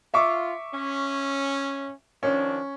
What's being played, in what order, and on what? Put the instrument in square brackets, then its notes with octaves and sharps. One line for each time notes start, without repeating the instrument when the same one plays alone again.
[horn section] F4 [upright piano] E5 C#6 D6
[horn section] C#4
[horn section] D#3 F3 D4 [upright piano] C#4